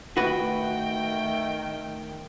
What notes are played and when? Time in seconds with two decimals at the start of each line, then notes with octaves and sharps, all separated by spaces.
0.17 D#3 A3 F#4 B4 G5